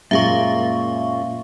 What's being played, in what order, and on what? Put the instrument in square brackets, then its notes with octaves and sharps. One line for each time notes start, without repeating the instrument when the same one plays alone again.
[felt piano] F#2 G#3 [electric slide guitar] A#2 [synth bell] E5 F5 C#6